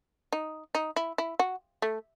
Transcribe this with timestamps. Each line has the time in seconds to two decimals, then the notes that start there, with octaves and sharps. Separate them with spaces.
0.32 D#4
0.75 D#4
0.96 E4
1.18 E4
1.39 F#4
1.82 A3